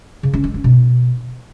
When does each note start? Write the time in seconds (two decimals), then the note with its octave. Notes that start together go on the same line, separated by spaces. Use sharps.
0.23 C#3
0.34 C#4
0.44 G#3
0.54 C#4
0.64 B2